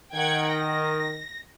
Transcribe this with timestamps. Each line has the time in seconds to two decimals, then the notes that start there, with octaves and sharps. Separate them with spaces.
0.14 D#3 F#5 G5 G#6
0.53 A#6